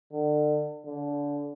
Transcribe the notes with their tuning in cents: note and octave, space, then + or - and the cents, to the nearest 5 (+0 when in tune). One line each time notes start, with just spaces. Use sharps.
D3 +35
D3 -25